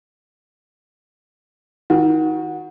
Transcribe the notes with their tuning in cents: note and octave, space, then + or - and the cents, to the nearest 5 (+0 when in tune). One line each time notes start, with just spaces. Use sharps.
D#3 +25 F#4 -15